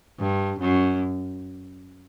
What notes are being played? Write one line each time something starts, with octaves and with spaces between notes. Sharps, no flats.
G2
F#2